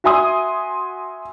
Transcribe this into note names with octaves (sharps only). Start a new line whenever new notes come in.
F#4 E5 G#5 C6 D#6